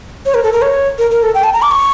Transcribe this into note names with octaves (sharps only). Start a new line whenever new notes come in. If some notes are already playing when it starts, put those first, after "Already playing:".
C#5
A#4
A4
A#4
C#5
A#4
A#4
A4
G5
A5
A#5
D6
C#6